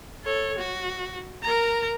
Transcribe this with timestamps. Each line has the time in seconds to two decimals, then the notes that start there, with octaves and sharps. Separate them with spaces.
0.25 A4 C#5
0.58 F#4
1.43 A#4 A#5